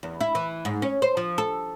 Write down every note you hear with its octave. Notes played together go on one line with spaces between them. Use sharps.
E2
E4
E3
G#2
C#4
C5
F3
A4